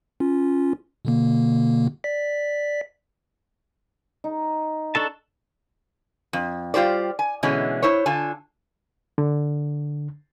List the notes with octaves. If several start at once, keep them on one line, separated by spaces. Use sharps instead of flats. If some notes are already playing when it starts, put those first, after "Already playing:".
C#4 F4
B2 D3 A#3
D5 B6
D#4
D4 A4 A5 C#6
F2
G3 F4 G4 C5 D5
G#5
B2 D3 E3 G#3 C#4
E4 C5 C#5
D3 F4 G#5 A5
D3